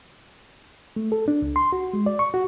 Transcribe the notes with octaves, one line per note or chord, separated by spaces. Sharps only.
A3
A4
D4
C#2
C6
F#4
G#3
D5
C#6
F#4